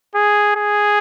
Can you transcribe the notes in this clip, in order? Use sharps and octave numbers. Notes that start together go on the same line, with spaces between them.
G#4
G#4